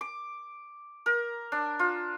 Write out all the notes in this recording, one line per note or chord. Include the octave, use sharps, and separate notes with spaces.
D6
A#4
D4
F4